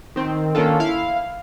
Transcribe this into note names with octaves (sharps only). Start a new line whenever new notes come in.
D#3 C4
D#3 A#3 C#4 D4 F4 A4
E4 F5